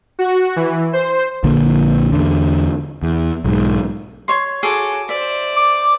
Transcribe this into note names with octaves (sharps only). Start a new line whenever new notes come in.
F#4
E3
C5
A#1 A#2 D3 A#3
E2 D3
E2
B1 G#2
C#5 C6
F#4 G#4 A4 C#5 D6
C5 D5 E5
D6